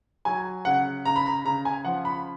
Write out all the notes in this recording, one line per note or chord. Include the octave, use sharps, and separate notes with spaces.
F#3 G#5
C#3 F#5
C#3 A#5
B5
A#5
C#3 A#5
G#5
F3 F#5
B5